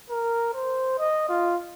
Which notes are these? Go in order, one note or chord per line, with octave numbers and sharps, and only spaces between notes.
A#4
C5
D#5
F4